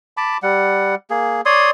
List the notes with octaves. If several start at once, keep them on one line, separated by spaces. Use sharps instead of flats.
A5 B5 D6
G3 F#5
A#3 G#4
C#5 D5 C6 D#6